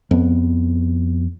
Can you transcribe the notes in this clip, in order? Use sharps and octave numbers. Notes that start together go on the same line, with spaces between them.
F2 B3